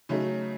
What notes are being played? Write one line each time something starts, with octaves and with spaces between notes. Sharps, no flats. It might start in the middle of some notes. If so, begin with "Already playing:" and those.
C#3 F#3 A3 C#4 D#4